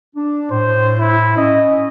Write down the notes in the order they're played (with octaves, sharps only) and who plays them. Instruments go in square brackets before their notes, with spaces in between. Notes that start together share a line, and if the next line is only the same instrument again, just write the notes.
[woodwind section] D4
[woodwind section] A2 [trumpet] C5
[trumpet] E4
[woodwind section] C#4 [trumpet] D#5